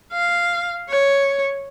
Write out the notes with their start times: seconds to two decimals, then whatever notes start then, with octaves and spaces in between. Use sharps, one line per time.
0.13 F5
0.89 C#5